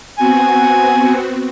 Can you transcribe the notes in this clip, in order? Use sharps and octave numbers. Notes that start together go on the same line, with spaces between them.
B3 C4 F#4 G#5